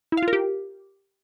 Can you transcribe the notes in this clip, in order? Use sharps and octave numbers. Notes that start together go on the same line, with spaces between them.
E4
F5
F4
A#4
G4